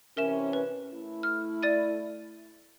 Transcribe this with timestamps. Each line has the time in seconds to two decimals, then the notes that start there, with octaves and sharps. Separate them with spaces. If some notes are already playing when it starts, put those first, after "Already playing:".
0.17 C3 E3 C#4 A#4 E5 E7
0.53 B4
0.93 A3 E4
1.23 F6
1.63 D5 A6 D#7